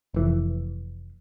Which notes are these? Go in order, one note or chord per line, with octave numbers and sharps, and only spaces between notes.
F1 E3